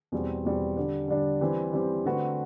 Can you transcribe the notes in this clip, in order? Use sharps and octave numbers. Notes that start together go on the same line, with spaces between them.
E2 B2 G3 C4
E2 B2 G3 C4
D3 G3 D4
D3 G3 D4
E3 G3 C4 G4 B4
E3 G3 C4 G4 B4
D3 A3 C4 F#4 B4